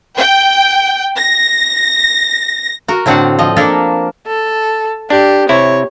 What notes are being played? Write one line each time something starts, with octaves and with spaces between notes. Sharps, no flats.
G5
A#6
F#4 A#4
A2 D3 C4 F#4 F5 F#5
F3 D#5
A#3 D4 A4 A#4
A4
D4 G4
C3 E4 C#5